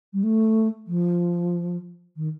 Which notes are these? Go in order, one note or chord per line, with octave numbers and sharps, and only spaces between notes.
G3
A3
F3
D#3